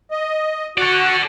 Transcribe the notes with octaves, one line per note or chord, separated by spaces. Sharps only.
D#5
F#4 A4 D5 F#5